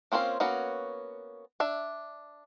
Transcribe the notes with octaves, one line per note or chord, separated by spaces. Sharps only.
A#3 C4 C#4 F4 C5
A#3 B3 C#4 F#4
D4 E5